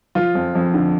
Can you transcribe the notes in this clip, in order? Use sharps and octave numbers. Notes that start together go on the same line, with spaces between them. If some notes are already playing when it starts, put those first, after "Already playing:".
F3 F4
F2
F2
D3